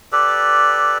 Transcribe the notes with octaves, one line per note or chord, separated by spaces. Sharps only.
G4 A4 B4 D5